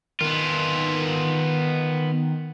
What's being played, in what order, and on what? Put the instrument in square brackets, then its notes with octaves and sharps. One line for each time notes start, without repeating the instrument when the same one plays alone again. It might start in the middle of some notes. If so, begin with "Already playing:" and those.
[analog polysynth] D#3 [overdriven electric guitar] B3 F4